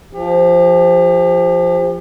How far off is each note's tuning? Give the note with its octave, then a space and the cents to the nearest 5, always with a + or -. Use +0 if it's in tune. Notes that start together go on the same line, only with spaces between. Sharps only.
F3 +0 G4 +40